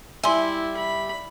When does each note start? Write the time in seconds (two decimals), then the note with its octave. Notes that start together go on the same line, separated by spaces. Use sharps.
0.24 G3 E4 E5 G#5 C6
0.77 B5